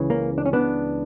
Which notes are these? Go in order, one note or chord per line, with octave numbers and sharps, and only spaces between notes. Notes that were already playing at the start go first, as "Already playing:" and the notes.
Already playing: C#2 C#3 E3
A#3 C#4
D4
C#4
B3 D4